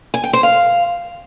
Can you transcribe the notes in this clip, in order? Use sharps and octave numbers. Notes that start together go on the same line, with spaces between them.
G#5
G5
C5
F5